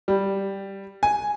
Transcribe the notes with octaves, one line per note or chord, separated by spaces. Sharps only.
G3
G#5